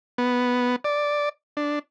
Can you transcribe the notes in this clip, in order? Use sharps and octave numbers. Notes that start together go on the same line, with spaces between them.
B3
D5
D4